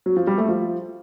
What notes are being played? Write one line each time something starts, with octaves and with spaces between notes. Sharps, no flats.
F#3
F3
G3
A3
F3